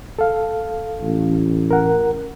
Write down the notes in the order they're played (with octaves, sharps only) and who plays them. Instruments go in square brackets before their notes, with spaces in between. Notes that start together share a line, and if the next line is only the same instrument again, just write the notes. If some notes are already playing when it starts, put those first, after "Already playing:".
[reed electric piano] A4 F5
[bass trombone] A1
[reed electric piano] A#4 F#5